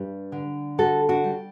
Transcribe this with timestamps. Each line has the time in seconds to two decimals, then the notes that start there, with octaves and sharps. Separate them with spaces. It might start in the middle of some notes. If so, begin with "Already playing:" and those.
Already playing: G2 G3
0.32 D3
0.78 G3 F#4 A4
1.09 D4 F#4
1.24 G3